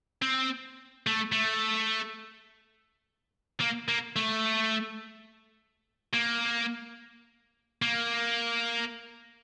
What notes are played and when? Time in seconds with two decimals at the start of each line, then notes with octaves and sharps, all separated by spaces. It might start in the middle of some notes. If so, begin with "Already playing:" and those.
0.22 C4
1.07 A3
1.32 A3
3.60 A#3
3.88 A#3
4.16 A3
6.14 A#3
7.82 A#3